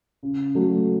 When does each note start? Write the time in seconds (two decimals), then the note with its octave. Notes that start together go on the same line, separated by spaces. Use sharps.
0.23 C#3
0.55 F#3 A3